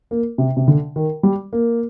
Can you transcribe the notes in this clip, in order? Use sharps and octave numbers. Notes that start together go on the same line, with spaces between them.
A#3
C3
C3
D3
D#3
G3
A#3